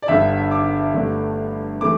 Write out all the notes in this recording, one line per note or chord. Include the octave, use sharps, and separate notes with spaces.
D5
G1 G2 D3 E5
D6
G1 G2 D3 A3
E3 A3 D6